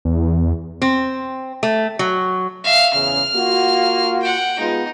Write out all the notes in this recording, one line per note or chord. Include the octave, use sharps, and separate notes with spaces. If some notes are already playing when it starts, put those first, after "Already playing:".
E2
C4
A3
F#3
E5 F5
E2 C#3 F6
A#3 F4 F#4
F#5 G5
G#3 B3 D#4 F4